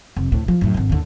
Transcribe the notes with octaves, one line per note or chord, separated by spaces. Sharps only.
F1
D2 A2
F3
F#2 A2
G#1 D3
D#2 D3